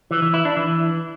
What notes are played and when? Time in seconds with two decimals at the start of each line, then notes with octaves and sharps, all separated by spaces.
0.11 E3
0.22 E3
0.34 E4
0.45 D4
0.57 E3